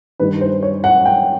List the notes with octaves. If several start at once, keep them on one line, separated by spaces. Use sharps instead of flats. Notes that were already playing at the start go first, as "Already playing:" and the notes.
G2 D#3 B4
C5
C#5
F#5
G5